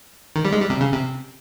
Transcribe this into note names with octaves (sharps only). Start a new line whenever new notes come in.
D#3
G3
G#3
G3
C3
C#3
C3